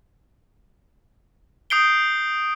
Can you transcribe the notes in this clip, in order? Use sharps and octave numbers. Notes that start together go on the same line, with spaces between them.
D#6 G6 C7 D7 G7